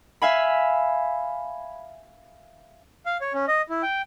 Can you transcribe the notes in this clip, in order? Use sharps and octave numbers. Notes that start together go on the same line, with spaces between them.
E5 F5 G#5 B5
F5
C#5
C#4
D#5
E4
G5